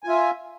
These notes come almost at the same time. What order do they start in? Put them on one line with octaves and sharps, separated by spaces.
G#5 F4 E5